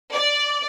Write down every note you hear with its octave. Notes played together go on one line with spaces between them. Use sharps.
D5